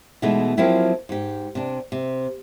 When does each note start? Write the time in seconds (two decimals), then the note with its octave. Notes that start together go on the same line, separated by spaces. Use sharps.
0.22 B2 E3 G#3 A3 D#4
0.57 F3 F#3 A#3 C4 E4 G4
1.09 G#2 G4
1.55 C3 D4
1.92 C3